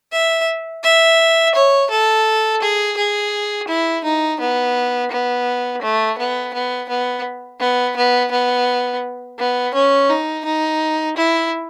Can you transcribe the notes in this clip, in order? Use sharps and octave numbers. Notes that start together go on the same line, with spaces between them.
E5
E5
C#5
A4
G#4
G#4
E4
D#4
B3
B3
A3
B3
B3
B3
B3
B3
B3
B3
C#4
D#4
D#4
E4